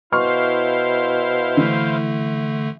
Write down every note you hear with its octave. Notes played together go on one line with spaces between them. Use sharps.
B2 E4 C5 F5 C6 C#6 F6
D3 E3 A3